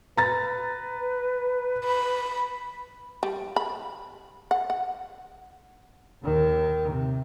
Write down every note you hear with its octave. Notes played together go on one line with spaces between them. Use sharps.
B4 A#5 A6
B5
G3
B5
F#5
F#5
D#2 D#3
C3